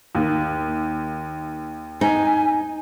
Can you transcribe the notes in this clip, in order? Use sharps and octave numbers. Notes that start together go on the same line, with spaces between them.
D#2
D#4 G#5